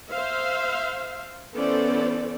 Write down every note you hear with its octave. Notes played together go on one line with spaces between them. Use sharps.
C5 E5 F5
E3 B3 C#4 A4 C5 D5